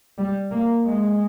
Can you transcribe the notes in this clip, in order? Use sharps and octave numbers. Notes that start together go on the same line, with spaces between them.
G3
A#3
G#3